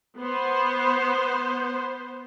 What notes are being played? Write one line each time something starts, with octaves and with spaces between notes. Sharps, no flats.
B3 C5